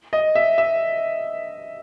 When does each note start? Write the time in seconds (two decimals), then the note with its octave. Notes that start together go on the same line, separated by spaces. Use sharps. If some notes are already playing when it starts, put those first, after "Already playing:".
0.13 D#5
0.35 E5
0.58 E5